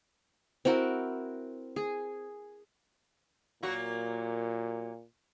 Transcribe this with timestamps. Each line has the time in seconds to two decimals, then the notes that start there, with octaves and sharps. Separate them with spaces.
0.65 C4 E4 F#4 A#4
1.76 G#4
3.63 A#2 F#3 A#3 F#4